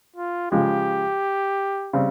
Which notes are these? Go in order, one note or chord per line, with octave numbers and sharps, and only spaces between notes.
F4
C#3 F3 G#3 G4
C#3 G3 C4